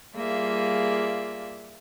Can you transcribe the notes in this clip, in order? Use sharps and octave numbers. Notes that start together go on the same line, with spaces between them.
G3 A#3 F4 G#4 D5 E5